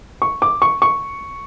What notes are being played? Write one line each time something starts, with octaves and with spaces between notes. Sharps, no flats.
C#6
D6
C#6
C#6